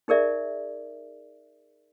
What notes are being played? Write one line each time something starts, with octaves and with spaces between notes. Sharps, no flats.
D#4 G#4 A#4 D5 E5